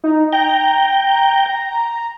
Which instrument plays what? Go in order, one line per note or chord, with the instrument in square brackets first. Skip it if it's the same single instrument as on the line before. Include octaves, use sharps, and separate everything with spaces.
[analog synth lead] D#4
[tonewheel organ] G5 [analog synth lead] A#5